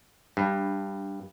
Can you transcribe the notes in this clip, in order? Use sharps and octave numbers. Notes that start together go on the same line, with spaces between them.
G2